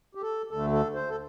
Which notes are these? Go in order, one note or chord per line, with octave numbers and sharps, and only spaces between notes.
G4
A4
D2 D3 A3 A4
A4
C5
A4